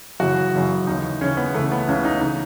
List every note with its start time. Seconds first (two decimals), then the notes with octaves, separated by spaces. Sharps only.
0.20 F#2 C#3 E3 F#4
0.53 F#2 C#3 E3
0.87 D#2 C#3 E3 D#4
1.21 D#2 C#3 E3 C#4
1.37 B3
1.54 C#2 C#3 E3 A3
1.72 B3
1.88 C#2 C#3 E3 C#4
2.05 D#4
2.21 C#3 E3 D#4